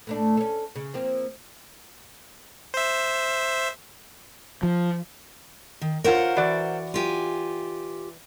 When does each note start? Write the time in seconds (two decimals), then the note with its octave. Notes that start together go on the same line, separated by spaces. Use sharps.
0.07 A2 A3 D4
0.37 C#4 A4
0.75 C#3
0.94 F3 A#3 C4
2.74 C5 E5
4.63 F3
5.82 D#3
6.04 F4 A#4 C5 C#5 F#5
6.37 E3 F#4 D5
6.94 F4 G4 G#5